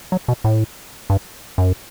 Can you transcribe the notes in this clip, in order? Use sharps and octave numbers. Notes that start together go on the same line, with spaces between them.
F#3
B2
A2
G2
F#2